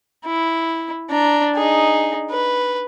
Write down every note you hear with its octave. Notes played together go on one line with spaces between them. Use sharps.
E4
D4 A#5
D#4 G#4
B4